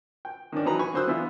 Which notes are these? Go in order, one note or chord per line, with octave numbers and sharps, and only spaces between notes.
G5
D#3 C#4 D4
E3 F#3 D#4 B4 A#5
G#5 B5 C#6
D3 F#3 C5 D#6 E6 F#6
D3 E3 B3 F4 E5